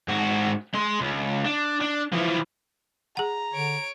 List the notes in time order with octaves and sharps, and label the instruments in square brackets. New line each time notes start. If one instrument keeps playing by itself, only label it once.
[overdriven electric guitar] G#2 F#4
G#3 C6
C#2
D4
D4
E3 F3
[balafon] G#4 F#5 [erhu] A#5
[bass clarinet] D3 [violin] C#5 D7